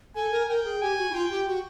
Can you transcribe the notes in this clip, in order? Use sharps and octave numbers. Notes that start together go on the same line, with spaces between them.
A4 G#5
A#4
A#4 G5
G#4
G4 G#5
F#4
E4
F4 G5
G4
F#4